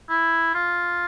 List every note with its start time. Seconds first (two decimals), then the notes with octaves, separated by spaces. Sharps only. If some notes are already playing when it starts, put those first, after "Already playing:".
0.09 E4
0.54 F4